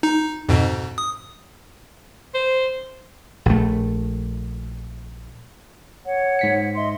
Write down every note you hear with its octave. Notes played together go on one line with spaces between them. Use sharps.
D#4
F2 G#2 B2
D#6
C5
A#1 A3
C#5 F#5
G#2 B6 C#7
D#5 E5 C6